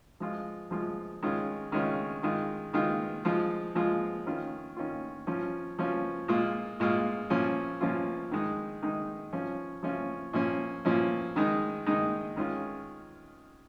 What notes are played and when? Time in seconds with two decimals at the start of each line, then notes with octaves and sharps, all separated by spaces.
0.20 F3 G#3 F4
0.71 F3 G#3 F4
1.22 D#3 G#3 C#4 F4
1.72 D#3 G#3 C#4 F4
2.23 D#3 G#3 F4
2.73 D#3 G#3 F4
3.25 F3 G#3 F4
3.75 F3 G#3 F4
4.26 D#3 C#4 F4
4.77 D#3 C#4 F4
5.27 F3 C#4 F4
5.79 F3 C#4 F4
6.28 A#2 G#3 F4
6.80 A#2 G#3 F4
7.30 A#2 F3 C#4 F4
7.81 A#2 F3 C#4 F4
8.31 D#3 G#3 D#4
8.82 D#3 G#3 D#4
9.33 F3 C#4 F4
9.83 F3 C#4 F4
10.33 A#2 F3 C#4
10.85 A#2 F3 C#4
11.36 D#3 G#3 D#4
11.86 D#3 G#3 D#4
12.36 D#3 G#3 C#4 F4